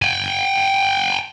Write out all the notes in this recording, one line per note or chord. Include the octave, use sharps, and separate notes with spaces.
G5 G#5